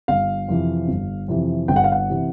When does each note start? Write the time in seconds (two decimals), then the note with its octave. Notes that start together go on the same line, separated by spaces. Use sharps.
0.08 G1 F5
0.48 F2 C3 E3
0.88 G1
1.28 F2 C3 E3
1.68 G1 G5
1.76 F#5
1.84 F5
1.92 F#5
2.10 C3 E3